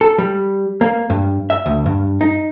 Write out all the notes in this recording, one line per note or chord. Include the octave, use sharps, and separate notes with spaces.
A4
G3
A#3
G2
E5
D2
G2
D#4